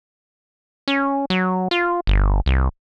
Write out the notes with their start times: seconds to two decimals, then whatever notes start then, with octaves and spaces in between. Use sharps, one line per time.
0.88 C#4
1.30 F#3
1.71 F4
2.07 G1
2.46 C2